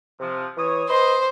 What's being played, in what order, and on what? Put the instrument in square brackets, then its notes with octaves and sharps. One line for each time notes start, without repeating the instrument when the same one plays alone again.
[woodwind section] C3 F3
E3 C#5 D#6
[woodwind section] B4 D#5 C6 [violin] C5